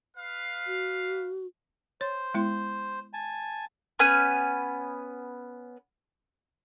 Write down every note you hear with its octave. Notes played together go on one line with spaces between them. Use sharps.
B4 F5
F#4
C5 C#5
G#3 B3 E4
G#5 A5
B3 C#4 G#5 B5